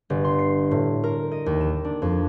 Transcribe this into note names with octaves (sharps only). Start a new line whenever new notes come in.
G1
C6
C7
A2
A#4
D#5
D#2
E7
D4
F2